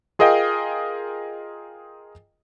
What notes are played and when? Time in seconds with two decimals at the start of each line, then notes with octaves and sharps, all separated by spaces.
0.19 F4 G#4 A#4 D#5 F5 G5